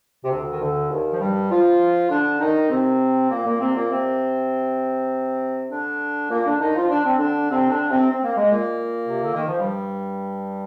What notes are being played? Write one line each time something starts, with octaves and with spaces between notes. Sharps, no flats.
C3
D2 D3
D#3
D2 D3
D#2 D#3
F3
G2 G3
F3 F4
D3 D4
D#3 D#4
C3 C4
A#2 A#3
A#2 A#3
C3 C4
A#2 A#3
C3 C4
D3 D4
A#2 A#3
D3 D4
D#3 D#4
F3 F4
D4
C4
D3 D4
C3 C4
D3 D4
C3 C4
C4
A#3
G#3
A#2 A#3
C3
D3
D#3
F3
G2 G3